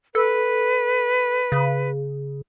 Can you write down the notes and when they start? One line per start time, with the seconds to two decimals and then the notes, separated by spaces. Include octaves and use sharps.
0.15 A4 B4
1.52 C#3